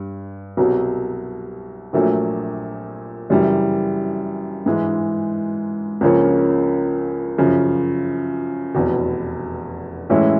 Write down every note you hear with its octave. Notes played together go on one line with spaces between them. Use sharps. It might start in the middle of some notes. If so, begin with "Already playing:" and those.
Already playing: G2
C2 B2 F#3
A#1 A#2 F#3 A3
F#2 C#3 E3 G3
G#2 E3 G#3
C#2 C#3 F3 A#3 C#4
F#2 C#3 F3
F1 E2 B2
A2 E3 G#3 C#4 E4